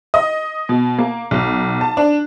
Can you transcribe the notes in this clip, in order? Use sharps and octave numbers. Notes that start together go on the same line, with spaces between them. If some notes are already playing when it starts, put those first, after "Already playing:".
D#5
B2
A#3
B1
A5
D4